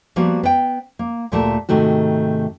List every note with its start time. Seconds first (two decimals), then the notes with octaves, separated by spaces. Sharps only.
0.16 F3 G3 A#3 B3 F#4
0.43 B3 G5
0.99 A#3
1.32 D2 A#2 A3 G4 A#4 A5
1.69 G#2 C3 D#3 A3 F#4